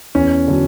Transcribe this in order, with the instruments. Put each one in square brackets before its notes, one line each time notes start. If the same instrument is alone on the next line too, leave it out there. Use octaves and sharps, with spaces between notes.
[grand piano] E2 C#4
D3 F#3